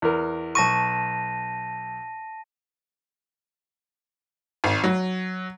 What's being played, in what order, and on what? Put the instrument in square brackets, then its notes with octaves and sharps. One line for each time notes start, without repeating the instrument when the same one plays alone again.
[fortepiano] E2 A#4
[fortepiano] B1 C#6 [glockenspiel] A5 A#6 D#7
[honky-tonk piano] G#1
F#3